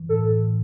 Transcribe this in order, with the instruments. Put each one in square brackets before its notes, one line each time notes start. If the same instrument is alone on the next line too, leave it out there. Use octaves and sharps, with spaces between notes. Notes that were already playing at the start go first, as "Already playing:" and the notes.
Already playing: [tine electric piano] E3
[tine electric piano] A2 [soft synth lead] A4